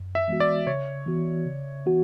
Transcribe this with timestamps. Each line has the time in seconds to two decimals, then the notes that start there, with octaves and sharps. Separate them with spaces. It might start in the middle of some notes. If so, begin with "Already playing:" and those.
Already playing: F#2
0.15 E5
0.28 E3 G#3 B3 F#4
0.40 D5
0.67 C#3 C#5
1.06 E3 B3 F#4
1.45 C#3
1.86 E3 B3 F#4